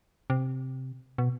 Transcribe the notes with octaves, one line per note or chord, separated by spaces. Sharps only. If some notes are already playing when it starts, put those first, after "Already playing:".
C3
B2